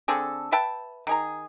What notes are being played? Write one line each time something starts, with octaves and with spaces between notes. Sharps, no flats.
D3 C4 G#4 A4
B4 E5 G5 A5
D#3 G#4 A#5